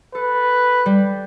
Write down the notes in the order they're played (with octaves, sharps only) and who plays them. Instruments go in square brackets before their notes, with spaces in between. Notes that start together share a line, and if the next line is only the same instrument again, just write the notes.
[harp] A4 [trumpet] B4
[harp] G3